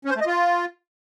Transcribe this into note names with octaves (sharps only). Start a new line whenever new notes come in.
C#4
C5
A3
D#5
F4